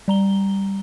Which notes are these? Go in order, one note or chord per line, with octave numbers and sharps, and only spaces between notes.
G3 A#5 G7